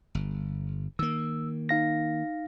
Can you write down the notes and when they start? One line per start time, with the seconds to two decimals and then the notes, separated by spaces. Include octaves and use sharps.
0.15 G1
0.99 D#3 A#3 E6
1.69 D#4 F5 A#6